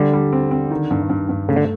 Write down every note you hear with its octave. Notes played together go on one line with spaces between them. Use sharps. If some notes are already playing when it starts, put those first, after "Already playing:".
Already playing: D3 G3
G3
C4
C4
D#3
G2
G2
G2
C#3 A3
D3